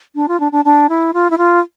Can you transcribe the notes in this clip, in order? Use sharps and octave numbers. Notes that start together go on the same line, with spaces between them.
D4
F4
D4
D4
D4
E4
F4
E4
F4